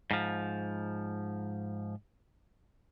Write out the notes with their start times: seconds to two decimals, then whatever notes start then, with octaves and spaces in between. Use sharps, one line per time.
0.11 G#2 F3